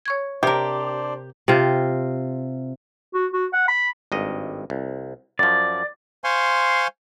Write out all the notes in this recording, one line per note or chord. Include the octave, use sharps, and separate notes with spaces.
C#5 C#6 G#6
C3 D4 G4 A#4 C5 D5
C3 F4
F#4
F#4
F#5
B5
G#1 G2 D#5
C2
F#2 F3 D5
C5 F5 G#5 C6 C#6